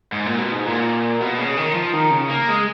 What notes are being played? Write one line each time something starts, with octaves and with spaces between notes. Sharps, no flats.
G#2
A#2
B2
G#2
A#2
B2
C#3
D#3
F3
D#3
C#3
A#3
G#3